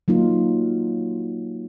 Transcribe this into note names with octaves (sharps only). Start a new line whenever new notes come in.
F#3 A#3 D#4 F4